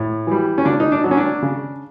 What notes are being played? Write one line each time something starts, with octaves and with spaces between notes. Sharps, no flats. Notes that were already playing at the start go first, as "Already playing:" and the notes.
Already playing: A2
E3 G3
C#4
C#3 D4
D#4
D4
F#3
C#4
D4
C#3